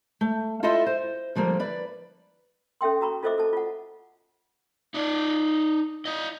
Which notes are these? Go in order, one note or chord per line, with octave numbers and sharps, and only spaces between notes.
A3
E4 F4 A4 C5 D#5 E5
C5
D3 F3 G3 A#3
B4 D5
C#4 A4 E5 G5 C6
F#4 A#5 B5 C#6
F4 A4 C5 D#5 E5 D6
A4 A5
F4 F#5
D#4 D5
E4 D#5